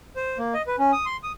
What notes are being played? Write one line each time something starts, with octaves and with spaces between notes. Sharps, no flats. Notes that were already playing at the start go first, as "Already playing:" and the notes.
C5
A#3
D#5
B4
C#4
D#6
C6
D#6